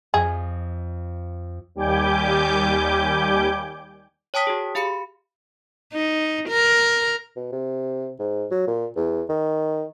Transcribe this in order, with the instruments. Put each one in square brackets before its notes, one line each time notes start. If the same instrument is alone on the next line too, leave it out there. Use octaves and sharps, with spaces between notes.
[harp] F2 D#5 [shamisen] G#4
[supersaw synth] D#2 G3 G4 G#5 D6 G6
[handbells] C#5 G5 A5 D#6 B6
F#4 G#4
G4 F5 B5 C#7
[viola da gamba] D#4
A#4
[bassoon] B2
C3
G#2
F#3
A#2
E2
D#3